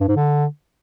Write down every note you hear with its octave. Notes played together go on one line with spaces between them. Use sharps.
G2
G#2
D3